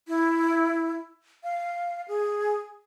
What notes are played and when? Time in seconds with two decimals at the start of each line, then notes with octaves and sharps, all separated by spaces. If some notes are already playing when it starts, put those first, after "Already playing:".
0.08 E4
1.43 F5
2.08 G#4